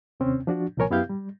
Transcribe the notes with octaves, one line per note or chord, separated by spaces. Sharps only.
D#2 C3 C4 C#4
F3 D4 F#4
C2 A#2 F3 A#4 C#5 G#5
F#2 B3 E4 G4 F5 G6
G3